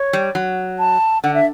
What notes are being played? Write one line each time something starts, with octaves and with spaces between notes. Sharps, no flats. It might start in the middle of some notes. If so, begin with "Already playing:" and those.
Already playing: C#5
G3
F#3
A5
D3 F#5
E5